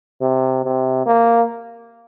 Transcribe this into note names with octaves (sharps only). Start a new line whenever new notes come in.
C3
C3
A#3